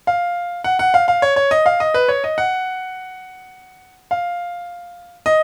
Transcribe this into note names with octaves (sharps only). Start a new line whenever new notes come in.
F5
F#5
F#5
F5
F5
C#5
C#5
D#5
F5
D#5
B4
C#5
D#5
F#5
F5
D#5